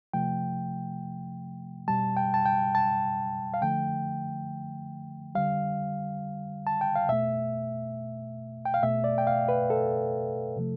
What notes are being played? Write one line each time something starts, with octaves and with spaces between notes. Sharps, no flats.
C3 F3 A3 G5
B2 G3 A5
G5
A5
G5
A5
F5
D3 F3 A3 G5
D3 G3 F5
A5
G5
F5
B2 A3 E5
G5
F5
B2 A3 E5
D5
G5
F5
B4
A4
C3 F3 A3